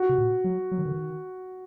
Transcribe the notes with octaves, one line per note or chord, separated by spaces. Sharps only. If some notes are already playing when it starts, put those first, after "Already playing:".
Already playing: F#4
C3
A#2
F#3
F#3
D#3
D3
D#3